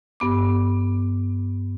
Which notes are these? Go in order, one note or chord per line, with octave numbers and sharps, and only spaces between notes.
G2 B3 D6